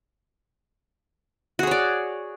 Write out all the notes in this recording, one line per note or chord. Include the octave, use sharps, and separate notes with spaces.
F#4 G#4 C#5 D5